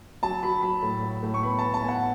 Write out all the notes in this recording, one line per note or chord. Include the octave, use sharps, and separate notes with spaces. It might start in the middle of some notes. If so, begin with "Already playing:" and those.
F#3 A5
F#3 B5
F#3 B5
A2
F#3
A2
C#6
B3 B5
A5
B3
A5
B3 G#5
F#5